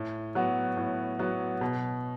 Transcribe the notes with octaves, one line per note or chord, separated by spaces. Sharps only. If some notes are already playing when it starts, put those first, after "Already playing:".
Already playing: A2
F#3 B3 F#4
A2
F#3 B3 F#4
B2